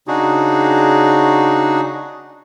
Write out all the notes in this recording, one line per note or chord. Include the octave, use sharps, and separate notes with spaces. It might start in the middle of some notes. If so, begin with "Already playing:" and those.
C#3 D4 D#4 F#4 G#4